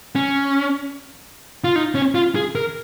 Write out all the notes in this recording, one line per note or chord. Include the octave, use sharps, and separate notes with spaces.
C#4
F4
D#4
C#4
F4
G#4
A#4